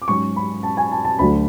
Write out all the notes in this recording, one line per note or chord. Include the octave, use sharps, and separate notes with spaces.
D6
G#2 F#3 C#4 C#6
B5
A5
G#5
A5
A5
D2 D3 F#3 A3 B5